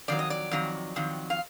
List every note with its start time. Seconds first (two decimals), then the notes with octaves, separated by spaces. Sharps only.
0.08 F2 D#3 F#3 D5
0.19 D#5
0.30 D5
0.51 F2 D#3 F#3
0.96 F2 D#3 F#3
1.30 F5